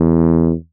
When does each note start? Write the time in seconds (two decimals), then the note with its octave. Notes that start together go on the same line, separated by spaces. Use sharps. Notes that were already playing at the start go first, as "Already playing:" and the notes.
Already playing: E2